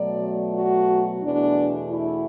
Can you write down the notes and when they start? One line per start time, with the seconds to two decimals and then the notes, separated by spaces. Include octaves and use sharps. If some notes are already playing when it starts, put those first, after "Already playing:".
Already playing: B2 F#3 A3 D5
0.55 F#4
1.23 E2 B2 A3 D4
1.90 E4